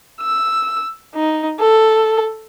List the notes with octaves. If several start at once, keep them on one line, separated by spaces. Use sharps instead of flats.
E6
D#4
A4